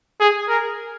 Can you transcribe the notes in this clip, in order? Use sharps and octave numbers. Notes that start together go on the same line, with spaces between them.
G#4
A#4